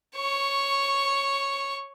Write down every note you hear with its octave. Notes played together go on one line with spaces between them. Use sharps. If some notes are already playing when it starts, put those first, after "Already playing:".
C#5 C#6